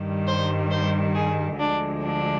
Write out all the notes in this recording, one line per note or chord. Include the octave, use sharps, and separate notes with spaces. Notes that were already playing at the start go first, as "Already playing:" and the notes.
Already playing: G2 D#3 G3
C5
C5
G#4
D2 D3 F3 G#3 D4
D4